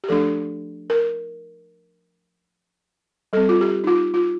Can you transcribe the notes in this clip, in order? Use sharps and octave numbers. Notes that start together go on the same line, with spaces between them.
G4
F3 A3 D4 A4
A#4
G3 C4 A4
F4
G4
D#4
F4
F4